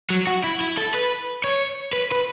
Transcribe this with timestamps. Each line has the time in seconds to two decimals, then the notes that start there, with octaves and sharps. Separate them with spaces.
0.10 F#3
0.27 F#4
0.44 E4
0.61 E4
0.77 A4
0.94 B4
1.44 C#5
1.93 B4
2.12 B4